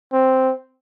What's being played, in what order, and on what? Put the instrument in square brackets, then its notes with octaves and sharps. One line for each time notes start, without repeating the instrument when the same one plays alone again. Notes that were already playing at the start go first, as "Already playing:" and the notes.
[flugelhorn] C4